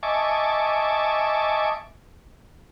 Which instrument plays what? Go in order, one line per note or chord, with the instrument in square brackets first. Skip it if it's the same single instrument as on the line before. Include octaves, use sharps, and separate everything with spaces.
[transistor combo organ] D#5 E5 G#5 A5 C#6 D6